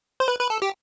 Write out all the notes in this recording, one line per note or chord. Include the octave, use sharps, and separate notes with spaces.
C5
B4
B4
A4
G4